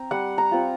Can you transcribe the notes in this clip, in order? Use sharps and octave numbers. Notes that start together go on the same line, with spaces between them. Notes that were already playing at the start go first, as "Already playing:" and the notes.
Already playing: C4 A#5
G3 F#5
A#5
C4 F4